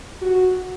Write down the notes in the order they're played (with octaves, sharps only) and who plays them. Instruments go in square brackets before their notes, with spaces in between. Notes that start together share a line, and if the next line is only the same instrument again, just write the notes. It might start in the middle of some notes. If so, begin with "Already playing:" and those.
[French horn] F#4